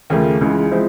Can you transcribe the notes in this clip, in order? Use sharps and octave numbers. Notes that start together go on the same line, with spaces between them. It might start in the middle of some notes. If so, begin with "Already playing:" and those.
D#2 C#3 F3 A3
C#2 C#3 E3 G#3
F3 G#3 C4 E4